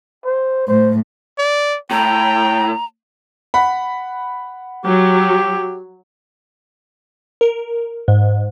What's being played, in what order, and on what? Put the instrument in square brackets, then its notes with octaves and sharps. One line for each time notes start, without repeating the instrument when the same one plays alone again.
[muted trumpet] C5
[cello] A2 [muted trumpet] C5
[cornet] D5
[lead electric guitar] A2 [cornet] G5 [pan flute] A#5
[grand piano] F#5 B5
[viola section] F#3 [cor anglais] G4
[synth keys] A#4
G#2